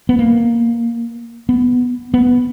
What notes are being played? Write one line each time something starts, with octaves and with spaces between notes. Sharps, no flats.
B3
A#3
B3
B3